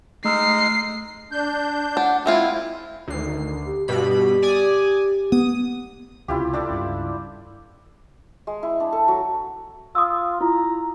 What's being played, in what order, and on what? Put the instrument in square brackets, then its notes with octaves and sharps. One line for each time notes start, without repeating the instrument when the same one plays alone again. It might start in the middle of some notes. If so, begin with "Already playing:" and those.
[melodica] G#3 D#4 [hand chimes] A3 E6 F6 [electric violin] C7
[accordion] D4 G6
[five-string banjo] D4 [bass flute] F#5
[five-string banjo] G#3 C4 F4 [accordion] E4 [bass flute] E5
[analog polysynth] D2 C7 [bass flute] D#3
[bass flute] G4
[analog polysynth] G2 B2 B5 [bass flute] G4
[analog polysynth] D5 G#5 D#6
[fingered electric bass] B3 [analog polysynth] D#6
[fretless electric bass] C#2 C3 [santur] E4 F4 G4
[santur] D4 A4 D5
[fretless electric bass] C#2 G2
[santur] G#3
E4
D4
A4
F#3
[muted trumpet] F4 [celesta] D#6 E6
[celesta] E4 F4 [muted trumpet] A#5